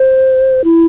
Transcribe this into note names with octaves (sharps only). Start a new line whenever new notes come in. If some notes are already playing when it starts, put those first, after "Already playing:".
Already playing: C5
E4